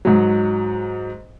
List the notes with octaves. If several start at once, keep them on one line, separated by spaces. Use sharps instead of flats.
G#2 F#3